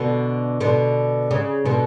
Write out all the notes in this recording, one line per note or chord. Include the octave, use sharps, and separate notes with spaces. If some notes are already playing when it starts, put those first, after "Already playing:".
Already playing: B2 D3
B2 D3
C#3
B2 D3